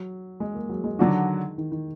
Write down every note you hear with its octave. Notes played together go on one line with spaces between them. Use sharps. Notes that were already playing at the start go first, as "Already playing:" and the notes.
Already playing: F#3
G#3
A#3
F#3
G#3
D3 D#3 F#3 D4 F#4
D#3
D#3